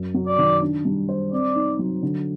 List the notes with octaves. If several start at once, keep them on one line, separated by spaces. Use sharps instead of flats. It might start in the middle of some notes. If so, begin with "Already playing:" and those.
Already playing: F#2
F#3
D5
D#3
D4
G3
C5
C4 D5
D#4
F#3
D3